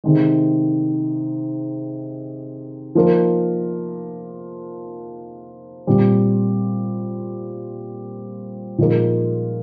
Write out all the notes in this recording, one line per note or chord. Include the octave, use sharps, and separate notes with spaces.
C3 D#3 G#3
F3 A#3 D#4 A#4
A#2 G3 C4
A#2 F3 G#3 D#4 A#4